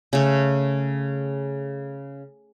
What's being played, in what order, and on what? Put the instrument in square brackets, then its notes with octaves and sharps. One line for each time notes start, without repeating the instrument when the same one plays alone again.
[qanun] C#3 A3